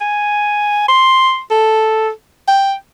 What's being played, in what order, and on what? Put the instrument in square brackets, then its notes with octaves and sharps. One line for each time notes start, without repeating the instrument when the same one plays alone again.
[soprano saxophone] G#5
C6
A4
G5